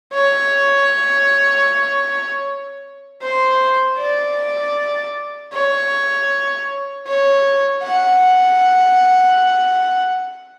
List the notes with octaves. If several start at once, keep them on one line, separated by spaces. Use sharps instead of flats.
C#5
C5
D5
C#5
C#5
F#5